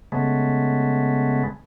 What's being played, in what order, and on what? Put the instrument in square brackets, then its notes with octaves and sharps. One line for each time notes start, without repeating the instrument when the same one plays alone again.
[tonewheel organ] C#3 G#3 A3 B3